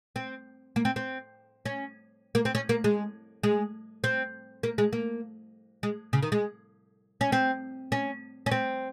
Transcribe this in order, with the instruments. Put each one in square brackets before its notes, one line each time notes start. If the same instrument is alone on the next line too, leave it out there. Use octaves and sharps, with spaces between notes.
[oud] C4
A#3
C4
C4
C#4
A#3
C4
C#4
A#3
G#3
G#3
C4
A#3
G#3
A#3
G#3
C#3
D#3
G#3
C#4
C4
C#4
C#4
C4